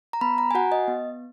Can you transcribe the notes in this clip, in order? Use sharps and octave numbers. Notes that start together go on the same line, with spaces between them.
A#5
B3 B5
A#5
G#5
F#4 F#5
D#5
B3